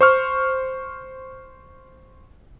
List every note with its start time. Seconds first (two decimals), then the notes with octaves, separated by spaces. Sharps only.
0.01 C5 C#6 F6